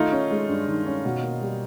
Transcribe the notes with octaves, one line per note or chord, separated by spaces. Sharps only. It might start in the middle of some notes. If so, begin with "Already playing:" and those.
Already playing: D#3 A3 D#4 F4
C#4
G#3
G2
D#3
C#4
B2
A#3
G3